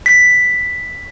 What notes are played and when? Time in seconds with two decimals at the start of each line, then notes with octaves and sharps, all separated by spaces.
0.06 B6